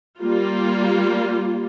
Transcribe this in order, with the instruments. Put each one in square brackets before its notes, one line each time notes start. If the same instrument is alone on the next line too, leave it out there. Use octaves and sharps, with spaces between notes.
[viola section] G3 A#3 F4